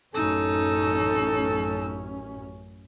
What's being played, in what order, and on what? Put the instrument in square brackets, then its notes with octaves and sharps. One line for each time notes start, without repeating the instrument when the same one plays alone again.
[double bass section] A1 F#2 C#4 [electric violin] D#4 E6 [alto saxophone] A4